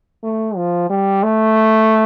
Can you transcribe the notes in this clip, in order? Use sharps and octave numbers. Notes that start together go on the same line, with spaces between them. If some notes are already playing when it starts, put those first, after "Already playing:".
A3
F3
G3
A3